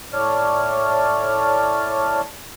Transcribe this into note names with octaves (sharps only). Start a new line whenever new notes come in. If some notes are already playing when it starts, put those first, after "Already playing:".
A2 C#5 D5 A5 F6